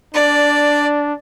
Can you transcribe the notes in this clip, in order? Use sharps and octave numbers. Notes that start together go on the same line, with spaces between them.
D4 D5